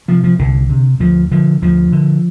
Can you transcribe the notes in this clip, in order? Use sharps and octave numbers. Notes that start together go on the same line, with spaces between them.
C3 F3
F3
C2 D3
C3
D2 F3
D3 F3
D2 F3
D3